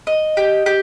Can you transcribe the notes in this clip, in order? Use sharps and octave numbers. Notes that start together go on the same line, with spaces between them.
D#5
G4
G4